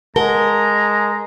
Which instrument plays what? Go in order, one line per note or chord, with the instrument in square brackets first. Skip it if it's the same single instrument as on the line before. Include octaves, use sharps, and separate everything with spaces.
[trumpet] G#3 [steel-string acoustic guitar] A#4 [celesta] F#5 A5 G7 [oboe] A#5